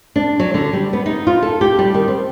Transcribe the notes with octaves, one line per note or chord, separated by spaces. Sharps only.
D4
F#3
D3
G3
B3
D#4
F4
A4
G4
G3
D#3
C4